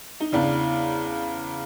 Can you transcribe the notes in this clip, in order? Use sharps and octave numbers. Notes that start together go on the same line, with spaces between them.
D#4
E2 C#3 E3 D4